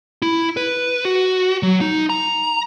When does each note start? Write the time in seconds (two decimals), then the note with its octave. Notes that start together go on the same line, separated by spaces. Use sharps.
0.22 E4
0.57 B4
1.05 F#4
1.63 F#3
1.81 D#4
2.10 A#5